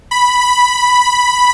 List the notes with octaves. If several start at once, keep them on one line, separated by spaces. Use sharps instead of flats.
B5
B5